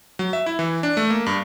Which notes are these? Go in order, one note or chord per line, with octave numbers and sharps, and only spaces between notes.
F#3
E5
E4
E3
D4
A3
A#3
G2